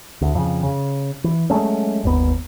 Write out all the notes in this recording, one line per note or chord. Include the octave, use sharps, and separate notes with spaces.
D2
F2 C#3
C#3
E3
F#3 G#3 A3 C#4
G1 D#2 B3